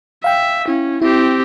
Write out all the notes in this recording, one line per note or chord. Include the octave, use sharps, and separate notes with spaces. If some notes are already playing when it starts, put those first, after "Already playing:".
E5 F5 G5
C#4 E4
C4 E4 G4